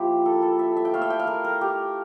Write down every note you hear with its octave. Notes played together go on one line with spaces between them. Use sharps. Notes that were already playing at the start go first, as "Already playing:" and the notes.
Already playing: F3 A#3 E4 G4
A4
A#4
A4
E5
E5
G5
A3 E4 F5
E5
G5
F5
A#4
A#4
G4